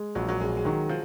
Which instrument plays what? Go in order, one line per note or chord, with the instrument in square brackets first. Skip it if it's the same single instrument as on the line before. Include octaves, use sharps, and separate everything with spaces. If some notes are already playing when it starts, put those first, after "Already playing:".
Already playing: [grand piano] G#3
[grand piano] A#1 [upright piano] F#3
[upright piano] F#3
[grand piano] A#1 [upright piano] G#3
[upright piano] G#3
[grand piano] D#3 [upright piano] F#3
[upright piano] F3